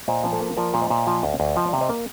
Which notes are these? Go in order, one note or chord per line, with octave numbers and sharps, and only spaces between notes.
A#2 C5 D#5
F3
A4 C5
A#3
F3 A#4 D5
A#2
C5 D#5
A#2
F3
D2
D2
F3 D#5 G5
D5 F5
C3
C5 D#5
A#3